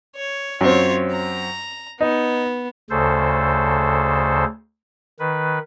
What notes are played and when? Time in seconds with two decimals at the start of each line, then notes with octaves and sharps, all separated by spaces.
0.15 C#5
0.61 F#2 C4 F4 C#5
1.11 A#5
2.01 B3 D#4
2.90 D2 C#3 A4 C5
5.19 D#3 B4